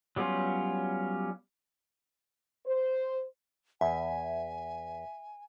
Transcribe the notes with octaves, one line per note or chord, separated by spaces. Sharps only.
F#3 G3 B3 C#4 F4
C5
E2 E5 G#5